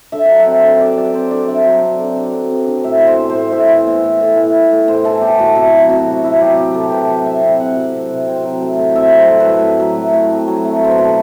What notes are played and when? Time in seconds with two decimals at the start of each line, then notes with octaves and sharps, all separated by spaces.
0.12 D3 E5
0.25 F#3 F#5
0.39 E5
0.46 C4
0.63 D3
0.80 D3 D5
0.97 F#3 D5
1.14 C4 C5
1.31 D3 D5
1.48 D3 E5
1.65 F#3
1.82 C4
1.99 D3
2.16 D3
2.34 F#3
2.50 C4
2.67 D3
2.84 A2 E5
3.01 E3
3.07 C5
3.18 B3
3.30 C5
3.35 A2
3.52 A2 E5
3.69 E3
3.86 B3
4.04 A2
4.21 A2
4.37 E3
4.54 B3
4.71 A2
4.88 A2 C5
5.04 E3 A4
5.18 B3 G4 A4
5.38 A2 F#4
5.55 C3 E4
5.72 F#3
5.89 C4 F#4
6.07 C3
6.24 C3 E4
6.41 F#3 G4
6.57 C4 G4
6.74 C3 A4
6.91 C3 B4
7.09 F#3
7.26 C4 E5
7.42 C3
7.60 C3 F#5
7.76 F#3
7.93 C4
8.10 C3
8.27 C4
8.44 F#3
8.61 A3
8.78 A2
8.96 C4 E5
9.13 F#3
9.18 C5
9.29 A3
9.40 B4
9.46 A2
9.63 C4
9.80 F#3
9.97 A3
10.14 A2
10.31 C4
10.48 F#3
10.65 A3
10.82 A2 C5
10.91 B4
10.98 B2 A4